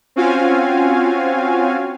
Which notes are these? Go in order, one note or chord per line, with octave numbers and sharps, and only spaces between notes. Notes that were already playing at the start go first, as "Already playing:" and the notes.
C4 C#4 F4 F#4 F5 G#5